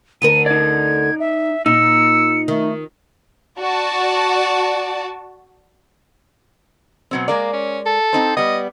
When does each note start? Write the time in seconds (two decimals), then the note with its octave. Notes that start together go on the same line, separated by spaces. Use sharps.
0.22 D2 D3 A#4 D#7
0.46 D#4 D5 G#6
1.20 E5
1.66 A#2 D#4 E6 C#7
2.48 D#3 A3
3.58 F#4 D5 A5
7.11 B2 F#3 C4
7.28 G#3 A#3 A#4 D5
7.53 C#4
7.86 A4
8.13 C4 D#4 C5
8.37 G3 B3 D#5